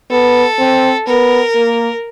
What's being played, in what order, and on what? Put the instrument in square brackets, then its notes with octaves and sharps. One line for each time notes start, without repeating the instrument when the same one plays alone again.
[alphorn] B3 [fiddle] A4
[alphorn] C4
[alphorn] B3 [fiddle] A#4
[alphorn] A#3